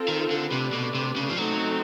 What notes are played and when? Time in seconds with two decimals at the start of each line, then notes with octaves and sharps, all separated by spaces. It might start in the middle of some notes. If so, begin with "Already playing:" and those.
Already playing: C4 F4 A4
0.08 D#3
0.30 D3
0.51 C3 A3 D4 G4 B4 D5
0.73 B2
0.95 C3
1.16 C#3
1.30 F3
1.37 F#3 A3 C4 D#4